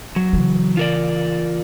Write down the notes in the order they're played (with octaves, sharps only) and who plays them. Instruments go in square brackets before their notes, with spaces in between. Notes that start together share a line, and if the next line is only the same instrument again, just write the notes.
[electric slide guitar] F#3
[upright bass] C#3 E3
[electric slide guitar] F4 A#4 D5